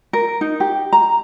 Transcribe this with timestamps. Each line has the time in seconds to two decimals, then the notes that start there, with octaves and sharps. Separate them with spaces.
0.13 A#4
0.41 D#4
0.60 G4
0.93 A#5